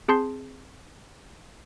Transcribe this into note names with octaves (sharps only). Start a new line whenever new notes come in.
C4 G#4 A5 C6 G6 C7